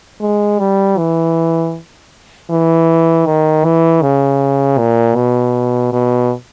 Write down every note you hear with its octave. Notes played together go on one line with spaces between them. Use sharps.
G#3
G3
E3
E3
D#3
E3
C#3
A#2
B2
B2